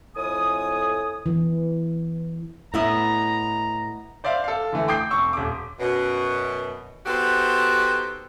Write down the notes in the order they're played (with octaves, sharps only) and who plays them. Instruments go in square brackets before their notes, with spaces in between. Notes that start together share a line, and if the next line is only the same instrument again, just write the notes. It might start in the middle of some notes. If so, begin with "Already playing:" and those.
[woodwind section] F2 A2 G#5 D#6
[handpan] E3
[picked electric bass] A2 [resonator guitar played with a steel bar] B3 E4 D#5 [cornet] A#5
[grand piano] C5 D5 E5 F5
A4 F5
D3 E3 A3
G5 D6 D#6 G6 C7
F1 C#6 E6
D#1 D6
[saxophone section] F#2 B2
B3 D#4 F#4 G4 A4 C5